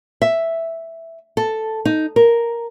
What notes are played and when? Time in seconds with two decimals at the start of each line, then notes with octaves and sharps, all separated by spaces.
0.22 E5
1.37 A4
1.85 D#4
2.16 A#4